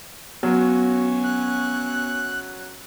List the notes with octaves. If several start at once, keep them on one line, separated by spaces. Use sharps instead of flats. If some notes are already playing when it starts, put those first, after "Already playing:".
F#3 B3 C#4 F#4
F#6